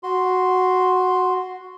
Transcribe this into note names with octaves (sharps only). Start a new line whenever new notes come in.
F#4 C6